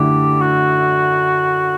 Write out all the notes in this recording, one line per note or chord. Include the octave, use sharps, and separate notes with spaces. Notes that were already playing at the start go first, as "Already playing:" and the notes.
Already playing: F#2 D3 A3 E4 G4
F#4